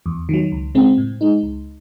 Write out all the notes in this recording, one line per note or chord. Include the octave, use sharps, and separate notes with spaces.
E2
D#3 F#3
C#2
C#3 G#3 C4
A2
G#3 D#4
C#2